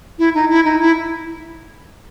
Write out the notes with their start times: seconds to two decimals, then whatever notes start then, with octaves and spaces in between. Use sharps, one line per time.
0.19 E4
0.35 D#4
0.50 E4
0.65 D#4
0.81 E4